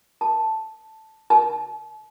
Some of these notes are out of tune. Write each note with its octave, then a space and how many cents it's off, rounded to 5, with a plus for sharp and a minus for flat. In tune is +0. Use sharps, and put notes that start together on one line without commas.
A5 +0
A5 -40